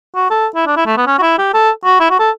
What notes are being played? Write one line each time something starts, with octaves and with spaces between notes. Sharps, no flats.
F#4
A4
E4
D4
E4
A3
B3
C#4
F#4
E4
G4
A4
F#4
E4
F#4
A4